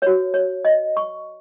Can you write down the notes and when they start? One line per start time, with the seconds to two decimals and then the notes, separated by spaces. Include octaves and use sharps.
0.02 F#4 B4 C#5
0.34 C#5
0.65 D#5
0.97 C#6